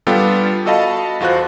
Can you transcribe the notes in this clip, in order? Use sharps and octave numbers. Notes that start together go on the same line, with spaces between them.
G3 B3 D4 F4 G4 A4
F#4 A4 D#5 F5 A5 B5
E2 F4 F#4 C5 F#6